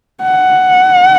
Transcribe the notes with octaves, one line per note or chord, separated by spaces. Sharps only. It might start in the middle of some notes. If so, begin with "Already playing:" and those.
F#5